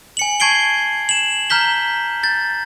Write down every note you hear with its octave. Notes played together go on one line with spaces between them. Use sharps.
G#5 C#7 F#7
A5 C#6 G#6 C7 D7 G7
E7 F#7
A#5 F6 G6 B6 G7
G6 A6